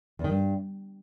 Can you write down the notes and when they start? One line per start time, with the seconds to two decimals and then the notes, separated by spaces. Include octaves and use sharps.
0.19 E2
0.24 D#3
0.30 G2